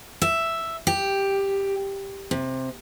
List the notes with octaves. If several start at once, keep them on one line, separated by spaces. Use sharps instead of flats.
E5
G4
C3